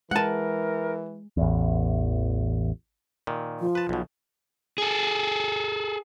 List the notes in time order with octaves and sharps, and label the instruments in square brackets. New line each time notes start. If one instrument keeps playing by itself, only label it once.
[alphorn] E3 [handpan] G#3 [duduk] A#4 [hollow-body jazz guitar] F#5 A5
[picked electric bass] A1 E2
[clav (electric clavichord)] A#2 D#3
[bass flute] F3
[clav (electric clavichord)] B4 A5
B1 B2
[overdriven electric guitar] G#4 A4